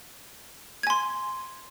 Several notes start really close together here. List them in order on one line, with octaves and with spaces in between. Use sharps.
G#6 G#5 C6